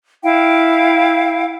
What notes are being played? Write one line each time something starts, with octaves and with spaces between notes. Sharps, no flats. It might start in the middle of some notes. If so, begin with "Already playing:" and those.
E4 F5 G5